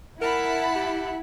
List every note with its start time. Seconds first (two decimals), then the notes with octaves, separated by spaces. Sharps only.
0.21 E4 A#4 F#5 A5 B5
0.75 G4